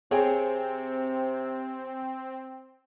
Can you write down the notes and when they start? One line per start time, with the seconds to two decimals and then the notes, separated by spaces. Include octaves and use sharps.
0.11 C3 C4 G#4 C#5 G5 G#5